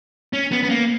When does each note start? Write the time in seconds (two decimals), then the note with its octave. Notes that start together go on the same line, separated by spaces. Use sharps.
0.33 C#4
0.52 B3
0.63 B3
0.70 A#3